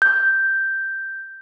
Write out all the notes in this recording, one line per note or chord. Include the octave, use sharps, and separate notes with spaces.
G6